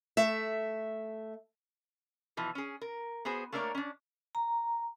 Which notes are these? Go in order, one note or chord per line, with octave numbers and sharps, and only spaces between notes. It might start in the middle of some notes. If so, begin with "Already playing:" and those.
A3 E5
B2 E3 F3
C#4 G#4
A#4
B3 F#4 G#4 C5
A3 A#3 D4 A#4 C#5 D5
C#4 D4
A#5